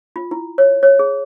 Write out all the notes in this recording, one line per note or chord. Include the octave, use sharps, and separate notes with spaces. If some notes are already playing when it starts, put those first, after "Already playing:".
F4
E4
C#5
C#5
G#4